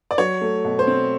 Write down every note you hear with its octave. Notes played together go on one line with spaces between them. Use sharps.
D5
F#3 C#5
A3
B2
C5
C4